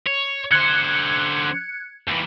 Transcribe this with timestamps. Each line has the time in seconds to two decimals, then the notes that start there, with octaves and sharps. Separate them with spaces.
0.06 C#5
0.51 D3 C5 F#6 G#6 C#7
2.08 D#2 E3